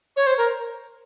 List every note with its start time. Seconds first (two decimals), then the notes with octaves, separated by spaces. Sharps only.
0.17 C#5
0.27 C5
0.38 A#4